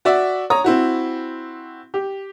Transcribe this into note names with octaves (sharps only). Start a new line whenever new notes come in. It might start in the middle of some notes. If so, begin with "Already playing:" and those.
F#4 D5 E5
C#5 A#5 D#6
C4 E4 F#4
G4